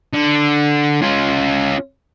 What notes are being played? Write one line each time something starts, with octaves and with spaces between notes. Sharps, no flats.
D3
C#4 F4